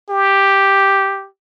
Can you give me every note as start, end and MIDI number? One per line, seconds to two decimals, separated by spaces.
0.10 1.28 67